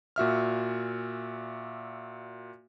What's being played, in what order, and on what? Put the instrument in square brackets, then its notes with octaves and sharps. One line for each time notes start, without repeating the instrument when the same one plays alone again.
[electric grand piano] A#2 F#4 E5 F6